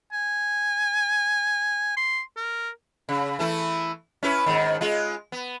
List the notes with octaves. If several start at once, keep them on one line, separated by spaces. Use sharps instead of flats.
G#5
C6
A#4
C#3
E3 A3 E4
C#4 E4 B4
G#2 D#3
G#3 F4
B3